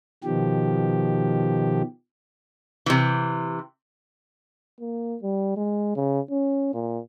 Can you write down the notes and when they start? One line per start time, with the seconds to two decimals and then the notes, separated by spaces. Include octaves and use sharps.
0.24 B2 D#3 F3 G4
2.86 C3 E3
4.80 A#3
5.22 G3
5.56 G#3
5.96 C#3
6.30 C#4
6.74 A#2